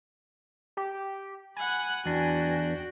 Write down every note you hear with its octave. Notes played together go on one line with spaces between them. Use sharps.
G4
F#5 G#5 B5
E2 D4 F#4 G5